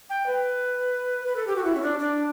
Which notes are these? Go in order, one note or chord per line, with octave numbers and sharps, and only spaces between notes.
G5
B4
B4
A4
G4
F#4
E4
C#4
D4
D4